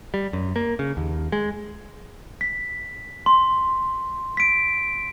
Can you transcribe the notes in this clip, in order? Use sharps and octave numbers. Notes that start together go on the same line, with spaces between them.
G3
F#2
A#3
C#3
D#2
G#3
B6
C6
B6 D7